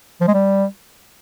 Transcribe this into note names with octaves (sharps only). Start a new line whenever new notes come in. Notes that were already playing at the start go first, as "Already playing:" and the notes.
F3
G#3
G3